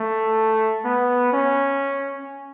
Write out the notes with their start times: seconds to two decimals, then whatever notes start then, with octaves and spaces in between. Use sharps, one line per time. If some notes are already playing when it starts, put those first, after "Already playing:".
Already playing: A3
0.85 B3
1.33 C#4